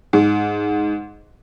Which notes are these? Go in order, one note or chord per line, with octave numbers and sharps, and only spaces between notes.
G#2